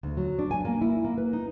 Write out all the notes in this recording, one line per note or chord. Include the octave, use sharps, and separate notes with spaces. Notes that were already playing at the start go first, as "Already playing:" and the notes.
D2
F#3
D4
G#5
A#3
E4
A#3
B4
D#4